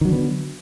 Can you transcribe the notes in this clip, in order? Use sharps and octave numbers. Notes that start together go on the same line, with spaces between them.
D3 D#3 F#3 B3